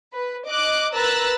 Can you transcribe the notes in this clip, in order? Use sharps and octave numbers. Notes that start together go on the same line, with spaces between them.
B4
D#5 D6 F#6
A#4 B4 A#5 E6 F#6 A6